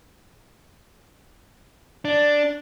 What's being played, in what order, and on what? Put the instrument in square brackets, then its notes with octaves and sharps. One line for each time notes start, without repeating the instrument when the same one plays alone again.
[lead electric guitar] D4